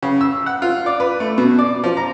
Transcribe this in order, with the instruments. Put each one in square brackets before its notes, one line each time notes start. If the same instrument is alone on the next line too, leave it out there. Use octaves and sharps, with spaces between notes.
[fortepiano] C#3
E6
F#5
F4
D5
B4
A3
B2
D5
F3
A#5